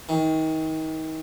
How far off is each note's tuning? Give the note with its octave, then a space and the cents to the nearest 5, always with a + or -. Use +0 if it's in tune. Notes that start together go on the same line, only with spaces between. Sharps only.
D#3 +30